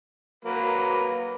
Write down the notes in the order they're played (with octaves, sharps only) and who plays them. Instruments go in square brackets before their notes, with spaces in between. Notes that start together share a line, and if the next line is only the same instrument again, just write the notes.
[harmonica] F#3 A#3 B4